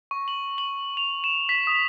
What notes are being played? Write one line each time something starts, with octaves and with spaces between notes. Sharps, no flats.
C#6
F#7
F#7
F7
E7
B6
D#6